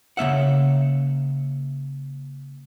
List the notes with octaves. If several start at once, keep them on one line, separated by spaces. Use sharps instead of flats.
C#3 A#3 E5 F#5